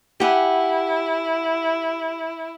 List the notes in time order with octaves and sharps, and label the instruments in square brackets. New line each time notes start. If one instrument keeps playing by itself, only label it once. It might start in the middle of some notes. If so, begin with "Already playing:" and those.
[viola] E4 [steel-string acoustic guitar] G4 F#5 G#5